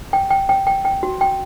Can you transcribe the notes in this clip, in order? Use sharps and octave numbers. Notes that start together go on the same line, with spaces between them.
G5
G5
G5
G5
G5
F#4
G5